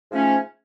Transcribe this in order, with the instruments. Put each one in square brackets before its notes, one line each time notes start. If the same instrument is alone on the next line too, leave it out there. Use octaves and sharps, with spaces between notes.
[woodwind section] G#2 F3 A3 C#4